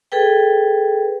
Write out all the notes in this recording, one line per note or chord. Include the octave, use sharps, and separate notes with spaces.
G#4 A4 B4 G5